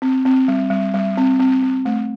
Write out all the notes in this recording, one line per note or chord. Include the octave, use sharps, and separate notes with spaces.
C4
C4
G3
G3
G3
C4
C4
C4
A3